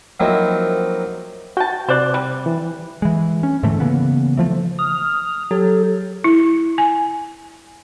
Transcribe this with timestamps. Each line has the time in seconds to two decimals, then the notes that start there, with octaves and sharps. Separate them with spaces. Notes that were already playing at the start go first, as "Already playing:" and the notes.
0.20 F3 F#3 A#3 C4 D#4 E4
1.57 F#4 G5 A5
1.89 C3 C5 D5 F#6
2.14 G3
2.46 E3
3.02 E3 G#3
3.43 C#4
3.63 G#2 D3 E3 A3
3.80 C#3 E3 A#3 B3
4.37 E3 F3 A3
4.79 D#6 F6
5.51 F#3 G4 A4
6.24 E4
6.78 G#5